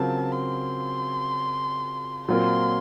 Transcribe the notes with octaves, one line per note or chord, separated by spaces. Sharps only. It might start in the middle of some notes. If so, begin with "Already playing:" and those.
Already playing: C#3 F#3 C4 F4 A#4 A5
C6
A#2 F#3 C4 F4 A#4 C6